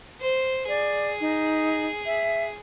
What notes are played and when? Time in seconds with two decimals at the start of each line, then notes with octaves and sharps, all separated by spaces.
0.21 C5
0.68 G#4 D5
1.20 D#4
2.06 E5